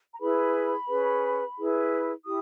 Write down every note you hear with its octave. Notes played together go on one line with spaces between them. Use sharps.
A#5
E4 G#4 B4 B5
C#4 G#4 B4
E4 G#4 B4
E4 G4 D#6